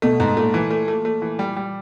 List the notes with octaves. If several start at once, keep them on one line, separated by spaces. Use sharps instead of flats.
B2 A3
G#2
A#2 A3
E3
A3
A3
A3
E3
G3
G3